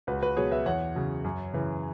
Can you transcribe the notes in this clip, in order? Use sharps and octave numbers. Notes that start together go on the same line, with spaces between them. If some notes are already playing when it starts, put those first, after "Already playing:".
C#2 F#4 B4
F#4 B4
B2 F#3 G#4 C#5
B4 E5
E2 C#5 F#5
C#3 F#3
F#2
C#3 E3